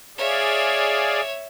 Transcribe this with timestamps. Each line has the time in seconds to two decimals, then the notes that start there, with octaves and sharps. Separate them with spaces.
0.17 G#4 C#5 D5 E5 F5